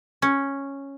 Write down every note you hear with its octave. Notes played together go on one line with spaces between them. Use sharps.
C#4